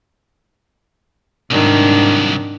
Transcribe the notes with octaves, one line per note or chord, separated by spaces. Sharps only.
C2 G#2 D#3 F#3 D4